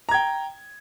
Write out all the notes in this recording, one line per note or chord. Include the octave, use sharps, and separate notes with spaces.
G5 A#5 G#6